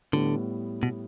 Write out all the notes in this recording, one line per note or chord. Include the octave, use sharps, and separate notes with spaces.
A2 D3 G3 B3
B2